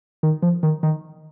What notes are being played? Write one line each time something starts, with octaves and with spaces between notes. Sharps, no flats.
D#3
F3
D#3
D#3